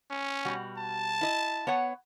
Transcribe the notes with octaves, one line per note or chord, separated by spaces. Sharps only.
C#4
B2 G3 F#4
A5
E4 D#5
B3 C#5 F#5